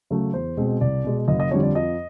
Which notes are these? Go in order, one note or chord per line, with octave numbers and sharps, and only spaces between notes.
C#3 F#3 A3
E2 C5
B2 G#3 C4
C2 D5
B2 G#3
F#1 D#5
D#5
F2 D3 G3 C#5
D5
F2 D#5